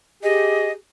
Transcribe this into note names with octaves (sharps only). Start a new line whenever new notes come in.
G4 G#4 D#5